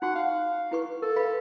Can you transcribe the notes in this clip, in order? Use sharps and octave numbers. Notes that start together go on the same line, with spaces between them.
D#4 F#4 F#5 C#6
F5
E4 B4 C#6
A4 A#4
B4 F5 B5